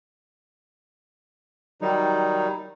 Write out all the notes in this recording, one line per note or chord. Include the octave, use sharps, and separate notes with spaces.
D#3 F#3 G3 D#4